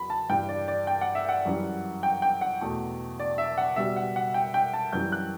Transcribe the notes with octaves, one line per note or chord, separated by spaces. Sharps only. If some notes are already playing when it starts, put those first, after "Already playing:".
Already playing: E2 F#3 B5
A5
G2 E3 G3 G5
D5
D5
G5
F#5
E5
F#5
F#2 E3 G3
G5
G5
F#5
E2 B2 A3
D5
E5
F#5
B2 G3 E5
F#5
F#5
G5
G5
A5
F#2 E3 G3 G6
F#6